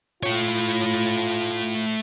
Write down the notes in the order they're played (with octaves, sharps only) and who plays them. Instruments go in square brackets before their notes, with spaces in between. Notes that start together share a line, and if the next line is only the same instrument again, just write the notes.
[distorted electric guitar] A3 C#5 [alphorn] F4